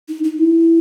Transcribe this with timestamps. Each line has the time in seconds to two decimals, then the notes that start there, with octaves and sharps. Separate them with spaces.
0.09 D#4
0.24 D#4
0.39 E4